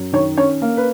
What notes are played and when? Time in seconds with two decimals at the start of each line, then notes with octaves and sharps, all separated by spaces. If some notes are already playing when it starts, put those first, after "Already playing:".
Already playing: F#2
0.13 D#3 C#5
0.37 C#4 C#5
0.62 A#3
0.77 B4